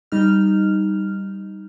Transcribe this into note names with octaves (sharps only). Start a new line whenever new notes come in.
G3 D#4 F6